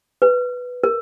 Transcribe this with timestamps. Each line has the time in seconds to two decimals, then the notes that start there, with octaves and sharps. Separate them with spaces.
0.22 B4
0.84 A#4